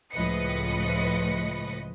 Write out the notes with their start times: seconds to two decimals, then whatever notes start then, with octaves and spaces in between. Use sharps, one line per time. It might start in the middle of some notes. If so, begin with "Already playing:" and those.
0.12 C#2 A2 F3 B4 D#5 C#7